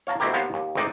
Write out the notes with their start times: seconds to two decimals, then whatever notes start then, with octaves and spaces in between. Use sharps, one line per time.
0.07 C#5 F5 A5 A#5
0.20 D2 B2 C4 E4 G4 A#4
0.33 D#2 B3 C5 F5 A#5
0.54 D#2
0.75 G#1 D2 C4 D#4 D5